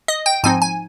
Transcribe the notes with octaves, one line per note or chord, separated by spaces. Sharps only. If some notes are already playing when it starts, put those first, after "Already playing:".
D#5
G5
G#2 F3 C4 D#4 G#5
G#5